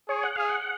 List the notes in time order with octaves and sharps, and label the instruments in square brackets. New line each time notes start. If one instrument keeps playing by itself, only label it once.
[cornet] G#4 [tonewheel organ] C#5
[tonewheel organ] F#5
[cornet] G#4 [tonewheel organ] F5
[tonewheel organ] F#5